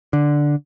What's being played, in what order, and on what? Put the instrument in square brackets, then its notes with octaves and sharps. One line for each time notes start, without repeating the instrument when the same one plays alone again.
[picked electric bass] D3